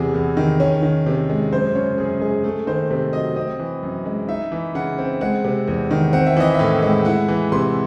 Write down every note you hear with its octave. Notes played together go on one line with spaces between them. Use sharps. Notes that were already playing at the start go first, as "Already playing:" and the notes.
Already playing: E2 C3 G#4
E2
D#3
C#4
D#3
C3
G#3
F#2 C5
C#3 C#5
F#2 G#4
G#3 G#4
A3 G#4
D#3 C5
C3
F#3 D#5
C4 D#5
E3
F#2
G#3
D#4 E5
E3
C#3 F#5
C4
G#3 F#5
C3
E2
D#3
C4 F#5
E5
E3 D#5
A2 E5
G#3
E4 F#5
E3
C3 C6